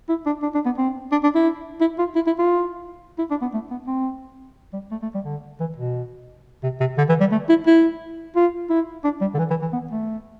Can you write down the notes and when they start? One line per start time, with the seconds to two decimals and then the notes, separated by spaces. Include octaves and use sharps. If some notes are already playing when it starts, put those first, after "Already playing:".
0.09 E4
0.26 D4
0.43 D4
0.54 D4
0.65 B3
0.78 C4
1.12 D4
1.24 D4
1.35 E4
1.81 E4
1.98 F4
2.15 E4
2.27 E4
2.38 F4
3.19 E4
3.31 D4
3.41 B3
3.53 A3
3.71 B3
3.87 C4
4.73 G3
4.91 A3
5.02 A3
5.14 G3
5.25 D3
5.60 E3
5.76 B2
6.63 C3
6.80 C3
6.98 D3
7.09 E3
7.20 G3
7.32 A3
7.49 E4
7.66 E4
8.36 F4
8.70 E4
9.04 D4
9.21 G3
9.34 D3
9.39 E3
9.50 E3
9.62 E3
9.73 B3
9.91 A3